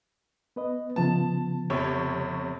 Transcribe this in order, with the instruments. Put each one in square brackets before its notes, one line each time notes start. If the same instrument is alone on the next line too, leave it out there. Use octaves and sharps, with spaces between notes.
[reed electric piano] B3 B4 D#5
[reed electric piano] C#3 F3 B3 [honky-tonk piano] A5
[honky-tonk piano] F1 C3 C#5